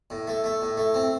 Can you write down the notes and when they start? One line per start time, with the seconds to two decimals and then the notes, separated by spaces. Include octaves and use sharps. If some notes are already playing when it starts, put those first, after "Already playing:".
0.10 A2
0.27 A3
0.44 A3
0.62 A2
0.77 A3
0.94 C4